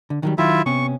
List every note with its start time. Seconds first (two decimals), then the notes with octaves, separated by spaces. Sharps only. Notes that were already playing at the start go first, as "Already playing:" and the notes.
0.10 D3
0.23 D#3 F#3 G3
0.38 D#3 F#3 E4 F4 E5
0.66 C3 B3 C#4 C#6